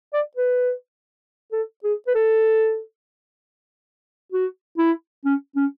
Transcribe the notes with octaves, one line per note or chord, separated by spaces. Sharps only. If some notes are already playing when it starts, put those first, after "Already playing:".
D5
B4
A4
G#4
B4
A4
F#4
E4
C#4
C#4